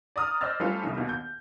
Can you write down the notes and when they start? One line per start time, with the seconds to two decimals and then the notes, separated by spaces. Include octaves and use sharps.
0.16 D5 A#5 D#6 F6
0.41 C5 D5 D#5 E6 F6 A6
0.60 G3 A3 C4 C#4 F4 A4
0.83 C2 D#3
0.97 D#2 B2 D#3
1.09 G6